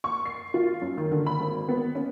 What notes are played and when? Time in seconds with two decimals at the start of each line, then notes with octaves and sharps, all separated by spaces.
0.04 C#6
0.25 C7
0.54 F4
0.82 F#2
0.98 D#3
1.11 D3
1.26 B5
1.40 G#1
1.69 B3
1.95 C#4